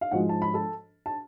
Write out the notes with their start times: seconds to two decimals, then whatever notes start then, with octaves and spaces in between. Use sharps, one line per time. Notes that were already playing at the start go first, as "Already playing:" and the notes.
0.01 F5
0.11 G#2 F3 G#3 F#4 F#5
0.29 A5
0.42 B5
0.54 A4 A5
1.06 A5